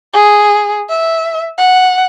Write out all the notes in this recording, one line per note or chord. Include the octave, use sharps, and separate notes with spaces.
G#4
E5
F#5